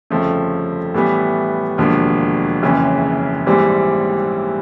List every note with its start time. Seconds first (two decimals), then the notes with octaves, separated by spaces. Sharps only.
0.10 G1 F2 C#3 F3 A3
0.94 A2 E3 G3 B3
1.78 E1 D#2 D3 F3
2.62 F#1 F2 C#3 E3
3.46 A#1 G#2 E3 G3 C4